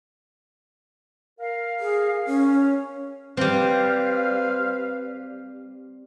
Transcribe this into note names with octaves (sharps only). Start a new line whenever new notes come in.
A#4 F5
G#4
C#4
G3 C4 B4 C5 F5